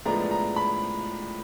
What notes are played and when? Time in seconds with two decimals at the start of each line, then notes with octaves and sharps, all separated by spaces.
0.06 A2 F3 G#3 B3 D4 A#5
0.31 A#5
0.56 B5